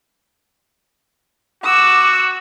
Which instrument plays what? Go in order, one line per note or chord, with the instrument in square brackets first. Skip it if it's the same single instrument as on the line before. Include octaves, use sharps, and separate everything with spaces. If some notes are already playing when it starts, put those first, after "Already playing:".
[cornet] F#4 [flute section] D6 [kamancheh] E6